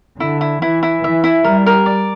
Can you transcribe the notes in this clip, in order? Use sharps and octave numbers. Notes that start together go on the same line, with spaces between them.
D3 E4
E4
E3 E4
E4
E3 E5
E4
G3 A#4
A#4
D5